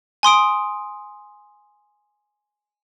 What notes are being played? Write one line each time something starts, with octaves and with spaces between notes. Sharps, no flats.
G#5 C6 D#6 D7